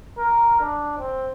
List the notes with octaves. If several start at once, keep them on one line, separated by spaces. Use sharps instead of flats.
A#4
D4
C4